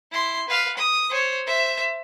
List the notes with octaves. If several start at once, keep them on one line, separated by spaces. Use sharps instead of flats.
E4 C6
B4 F5
D#6
C5 C#5
C5 E5